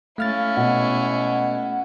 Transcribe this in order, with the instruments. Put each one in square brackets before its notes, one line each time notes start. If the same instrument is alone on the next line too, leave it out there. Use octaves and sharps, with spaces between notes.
[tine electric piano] A3 F6 A6 [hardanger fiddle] C#4 E4 [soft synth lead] F5
[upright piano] B2 [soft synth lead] F#5